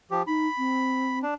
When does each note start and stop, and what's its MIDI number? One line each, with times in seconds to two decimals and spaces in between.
0.11 0.22 53
0.11 0.22 67
0.27 0.48 63
0.27 1.19 83
0.58 1.22 60
1.23 1.34 62